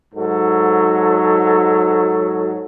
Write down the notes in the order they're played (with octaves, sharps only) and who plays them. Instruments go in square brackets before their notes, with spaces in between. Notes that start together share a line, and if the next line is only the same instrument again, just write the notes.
[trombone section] G#2 F#3 A4